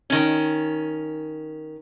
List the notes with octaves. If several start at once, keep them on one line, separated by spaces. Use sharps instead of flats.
D#3 C#4